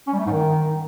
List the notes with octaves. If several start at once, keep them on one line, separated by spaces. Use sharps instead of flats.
C#4
G3
A3
G#2
D#3